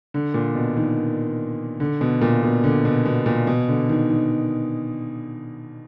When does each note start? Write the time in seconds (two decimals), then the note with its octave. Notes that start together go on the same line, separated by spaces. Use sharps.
0.14 D3
0.34 A#2
0.55 B2
0.77 D#3
1.80 D3
2.01 B2
2.21 A#2
2.43 B2
2.64 D3
2.85 B2
3.06 B2
3.26 A#2
3.47 B2
3.68 D3
3.89 D#3
4.09 D#3